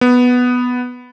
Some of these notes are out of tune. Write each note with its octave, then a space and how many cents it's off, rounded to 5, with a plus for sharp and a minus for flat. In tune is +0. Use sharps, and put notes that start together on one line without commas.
B3 +0